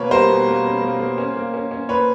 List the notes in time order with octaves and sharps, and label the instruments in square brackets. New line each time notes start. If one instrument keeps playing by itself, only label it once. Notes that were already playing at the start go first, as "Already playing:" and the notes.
Already playing: [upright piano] B2 A#3 B4 C#5
G3 A#4 C5
B2
A#3
C#4
A#3
A#3
C#4
A#3
C#4
C#4
A#2 B4 C#5